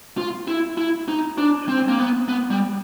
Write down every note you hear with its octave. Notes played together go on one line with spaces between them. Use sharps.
F4
E4
E4
D#4
D4
C4
A#3
B3
B3
G3